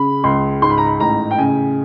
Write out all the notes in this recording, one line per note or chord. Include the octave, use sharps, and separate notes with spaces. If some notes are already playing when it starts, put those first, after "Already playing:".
Already playing: C#3 B5
C#2 C6
G#2 C6
B5
A#5
B5
A1 A#5
G5
C#3 G#5